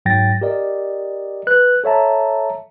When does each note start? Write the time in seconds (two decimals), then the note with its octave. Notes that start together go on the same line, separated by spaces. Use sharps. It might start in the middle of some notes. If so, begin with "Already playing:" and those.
0.06 G#2 F#3 G5 A6 A#6
0.41 G4 A#4 D5 D#5
1.47 B4 F#6
1.84 A4 C#5 E5 A5 A#5